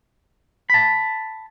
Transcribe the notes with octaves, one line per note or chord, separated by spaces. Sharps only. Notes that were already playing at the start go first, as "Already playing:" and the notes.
A5 B5